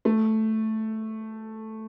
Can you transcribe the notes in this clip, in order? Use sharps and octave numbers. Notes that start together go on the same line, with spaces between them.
A3